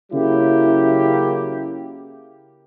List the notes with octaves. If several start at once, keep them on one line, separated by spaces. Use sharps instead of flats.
C#3 F#3 A#3 E4 G4